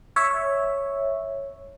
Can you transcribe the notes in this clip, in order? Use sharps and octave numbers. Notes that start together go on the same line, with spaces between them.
C#5 E5